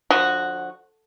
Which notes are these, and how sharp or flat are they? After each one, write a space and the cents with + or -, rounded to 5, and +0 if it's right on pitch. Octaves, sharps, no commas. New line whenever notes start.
D3 +0 F3 +25 F#4 +0